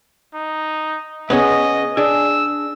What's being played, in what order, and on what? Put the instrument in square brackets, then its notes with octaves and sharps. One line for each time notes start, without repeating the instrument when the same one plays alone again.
[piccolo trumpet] D#4
[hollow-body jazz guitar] B3 C#4 G#4 [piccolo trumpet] D#5
[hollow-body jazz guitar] D4 G#4 [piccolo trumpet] E6